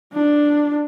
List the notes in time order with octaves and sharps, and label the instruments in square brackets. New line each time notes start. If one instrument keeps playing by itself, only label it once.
[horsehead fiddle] D4